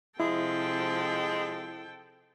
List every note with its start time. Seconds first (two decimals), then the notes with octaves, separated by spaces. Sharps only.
0.20 C3 F3 G#3 E4 A4 G5